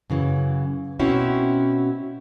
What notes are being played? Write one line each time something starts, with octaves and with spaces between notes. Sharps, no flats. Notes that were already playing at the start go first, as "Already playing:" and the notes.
F#2 C#3 E3
B2 C4 C#4 E4 F#4